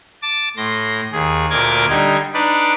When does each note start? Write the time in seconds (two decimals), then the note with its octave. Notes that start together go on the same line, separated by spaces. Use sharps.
0.22 A5 D6
0.57 A2 C6 A#6
1.12 D#2 G#4
1.50 D2 A#2 A#4 D#5 D6 G#6
1.89 D3 G3 D#4 D#5 G#6
2.34 D4 D#4 B4 D5